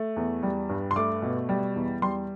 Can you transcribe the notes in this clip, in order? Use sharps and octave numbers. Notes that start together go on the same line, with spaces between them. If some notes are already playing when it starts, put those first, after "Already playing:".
Already playing: A3
E2
G3
G2
C6
A3 D6
B2
G3
E2
G3 C6